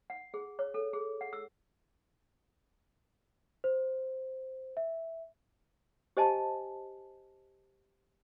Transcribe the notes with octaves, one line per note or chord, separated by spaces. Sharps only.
F#5
G#4
C#5
A4
G#4
F#5
E6
C5
E5
G4 C5 D#5 G#5 A5